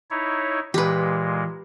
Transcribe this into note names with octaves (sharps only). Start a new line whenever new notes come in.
D#4 E4 C#5
A#2 E3 G#3 G4 B4